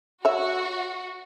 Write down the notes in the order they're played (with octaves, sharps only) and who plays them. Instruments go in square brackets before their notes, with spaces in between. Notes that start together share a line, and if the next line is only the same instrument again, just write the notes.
[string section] F#4 [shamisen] C#5 E5